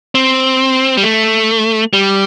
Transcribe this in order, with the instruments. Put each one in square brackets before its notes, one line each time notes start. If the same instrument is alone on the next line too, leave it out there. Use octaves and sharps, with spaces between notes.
[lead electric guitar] C4
G3
A3
G3